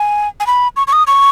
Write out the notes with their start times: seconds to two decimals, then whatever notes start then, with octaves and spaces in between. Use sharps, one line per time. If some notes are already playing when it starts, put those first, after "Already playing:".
Already playing: G#5
0.40 G#5
0.47 B5
0.77 C#6
0.87 C#6
0.93 D#6
1.07 C#6